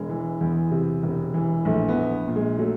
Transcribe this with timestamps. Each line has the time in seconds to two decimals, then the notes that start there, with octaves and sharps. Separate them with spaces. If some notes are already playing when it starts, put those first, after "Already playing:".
Already playing: E1 G#3
0.09 E3
0.41 E2
0.71 C3
1.03 E1
1.34 E3
1.65 A#1 A3
1.88 B3
1.97 A#1
2.28 A#2
2.36 G#3
2.59 F#3 A3